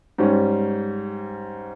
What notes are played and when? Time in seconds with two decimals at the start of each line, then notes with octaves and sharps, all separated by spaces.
0.18 G#2 G3 C#4